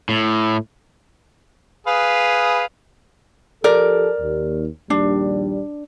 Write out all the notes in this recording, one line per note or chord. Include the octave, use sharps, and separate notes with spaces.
A2
G#4 B4 F5
F3 G4 A4 A#4 D5
D#2
A#1 D#2 G3 D4